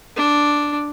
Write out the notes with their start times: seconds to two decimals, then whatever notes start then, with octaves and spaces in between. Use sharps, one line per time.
0.17 D4